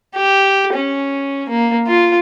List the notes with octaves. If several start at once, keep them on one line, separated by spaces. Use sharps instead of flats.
G4
C#4
A#3
F4